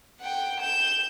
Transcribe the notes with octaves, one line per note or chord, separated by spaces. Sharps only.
F#5 G5
G6 E7